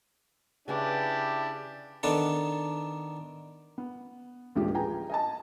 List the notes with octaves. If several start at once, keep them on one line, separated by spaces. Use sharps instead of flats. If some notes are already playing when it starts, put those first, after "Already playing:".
C#3 C#4 D4 E4 G4 B4
D#3 B3 D4 A4
B3
D#1 A1 G2 F3 G#3 G4
F4 G#4 B4 G5 G#5 A#5
D#5 G#5 A5